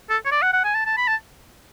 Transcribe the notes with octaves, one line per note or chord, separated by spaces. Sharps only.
A4
C#5
D5
F#5
F#5
G#5
A5
A5
B5
A5